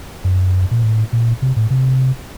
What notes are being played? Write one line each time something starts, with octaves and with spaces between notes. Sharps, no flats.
F#2
A#2
A2
A#2
C3
A2
C3